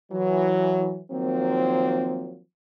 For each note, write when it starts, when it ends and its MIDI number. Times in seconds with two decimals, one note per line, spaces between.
0.12 1.01 52
0.12 1.01 54
1.12 2.40 51
1.12 2.40 53
1.12 2.40 54
1.12 2.40 58
1.12 2.40 60